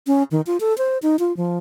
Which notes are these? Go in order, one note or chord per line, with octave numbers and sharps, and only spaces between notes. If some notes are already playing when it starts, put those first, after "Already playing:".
C#4
D#3
F4
A4
C5
D#4
F4
F3